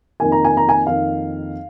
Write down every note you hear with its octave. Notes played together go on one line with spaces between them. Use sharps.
F2 D#3 A#3 G#5
A#5
G#5
A#5
G#5
F2 D#3 A#3 F5